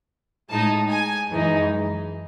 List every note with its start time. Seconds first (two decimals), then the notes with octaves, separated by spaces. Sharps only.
0.50 A2 G#3 D#4 A5
0.90 G#5
1.29 F#2 E3 G#3 D#4